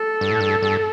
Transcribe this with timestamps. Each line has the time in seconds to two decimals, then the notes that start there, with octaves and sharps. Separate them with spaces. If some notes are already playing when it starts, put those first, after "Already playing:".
Already playing: A4
0.21 G2
0.31 A2
0.41 G2
0.62 G2